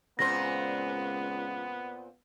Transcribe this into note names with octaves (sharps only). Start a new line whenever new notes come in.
C#2 A#2 B3 C4 C5 A#6